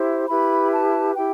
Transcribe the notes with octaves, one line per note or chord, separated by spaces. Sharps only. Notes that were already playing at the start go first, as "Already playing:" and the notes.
Already playing: E4 G4 C5
E4 G4 B4 B5
A5
E4 G4 G5